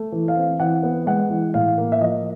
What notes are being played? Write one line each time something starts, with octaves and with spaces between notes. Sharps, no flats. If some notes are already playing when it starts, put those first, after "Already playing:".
Already playing: A3
E3
F5
C4
E3 F#5
B3
G#3 F#5
E3
A2 F5
A#3
E5
F3 D#5